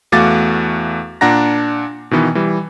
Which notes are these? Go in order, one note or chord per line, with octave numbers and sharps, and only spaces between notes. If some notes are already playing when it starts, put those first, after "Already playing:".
E2 A3 F#4 F5 D6 A6
A#2 D4 F#5 A#5 A#6
B2 D#3 E3 B3
E3 G3